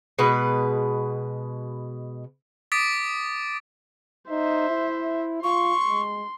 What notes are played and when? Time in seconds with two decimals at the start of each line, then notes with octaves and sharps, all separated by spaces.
0.19 B2 G#3 B4
2.72 D6 D#6 A6 B6 D7
4.30 D#4 C5 E5
4.70 E4
5.43 F4 C6 C#6
5.88 G#3